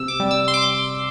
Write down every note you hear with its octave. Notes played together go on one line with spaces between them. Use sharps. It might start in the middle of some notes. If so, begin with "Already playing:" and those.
Already playing: C3 E6
D6
G3
E6
C6
D6